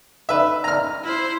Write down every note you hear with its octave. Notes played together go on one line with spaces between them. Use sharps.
B4 E5
A#5 F6
E4 C5